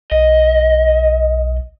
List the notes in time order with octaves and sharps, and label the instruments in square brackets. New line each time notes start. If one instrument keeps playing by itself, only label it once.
[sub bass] B1 [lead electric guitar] D#5